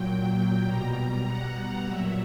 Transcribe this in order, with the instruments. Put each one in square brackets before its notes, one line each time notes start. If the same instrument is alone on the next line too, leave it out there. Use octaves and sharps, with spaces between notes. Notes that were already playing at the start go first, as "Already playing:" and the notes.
Already playing: [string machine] A#2 F#3 G5
B2 G3 A#5
F#5
A#2 F#3 E5